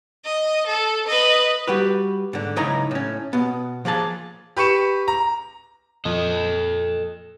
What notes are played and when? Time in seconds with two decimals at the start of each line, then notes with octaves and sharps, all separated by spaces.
0.25 D#5
0.66 A4
1.08 B4 D#5
1.67 G3 F#4 G4 B4
2.33 G#2 D3
2.57 C#2 F#3 D#4 E4 G#5 A#5
2.91 A2 C#4
3.33 B2 B3
3.85 F3 A#3 G#4 A5
4.57 G4 B4 C#6 C#7 E7
5.08 A#5
6.05 F2 A#2 F3 A4 D#5